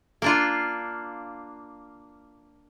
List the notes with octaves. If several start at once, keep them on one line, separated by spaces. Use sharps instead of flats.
A#3 D4 F4